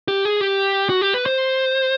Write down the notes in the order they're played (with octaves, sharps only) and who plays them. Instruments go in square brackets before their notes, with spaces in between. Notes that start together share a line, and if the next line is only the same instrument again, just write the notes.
[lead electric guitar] G4
G#4
G4
F#4
G4
B4
C5